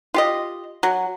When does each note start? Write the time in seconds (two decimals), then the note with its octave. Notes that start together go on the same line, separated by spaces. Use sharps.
0.14 F4 G4 D#5
0.83 F#3